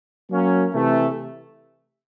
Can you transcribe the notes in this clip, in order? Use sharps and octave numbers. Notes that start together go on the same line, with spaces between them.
F#3 A#3 C#4
C3 E3 A3